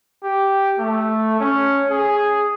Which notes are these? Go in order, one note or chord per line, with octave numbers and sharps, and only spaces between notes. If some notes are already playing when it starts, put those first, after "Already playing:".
G4
A3
C#4
G#4